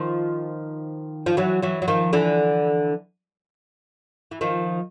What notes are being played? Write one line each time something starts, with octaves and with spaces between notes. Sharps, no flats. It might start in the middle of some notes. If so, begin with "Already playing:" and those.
Already playing: D#3 F3
F3
E3 F#3
E3 F#3
F#3
D#3 F3
D3 E3
E3
D#3 F3